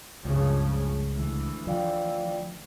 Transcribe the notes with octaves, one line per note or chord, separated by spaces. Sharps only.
C#2 G2 C#3 F3
D2 E3
F3 D5 F5 G5